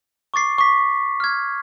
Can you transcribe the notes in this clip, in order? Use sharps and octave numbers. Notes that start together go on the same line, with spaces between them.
C#6 D6 A6 C7
C#6 D6 B6
F6 G#6